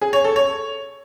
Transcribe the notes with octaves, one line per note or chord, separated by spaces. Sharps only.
G#4
C#5
A4
C#5